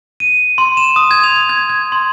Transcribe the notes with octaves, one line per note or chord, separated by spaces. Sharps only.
D#7
C6
E7
D#6
G#6
F7
G#6
G#6
C6